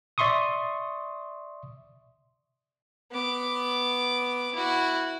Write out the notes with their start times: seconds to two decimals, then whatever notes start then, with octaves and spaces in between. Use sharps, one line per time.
0.18 D5 E5 C6 C#6 D#6
3.11 B3 D6
4.54 E4 F#4